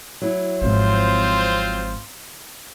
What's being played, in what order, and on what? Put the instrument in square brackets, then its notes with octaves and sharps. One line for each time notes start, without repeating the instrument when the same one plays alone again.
[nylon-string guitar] F#3 E4
[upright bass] G#1 F3 [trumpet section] C4 F4 C5